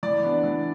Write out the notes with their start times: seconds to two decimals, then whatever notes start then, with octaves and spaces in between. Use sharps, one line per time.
0.03 E3 D5
0.22 B3 D4
0.43 E3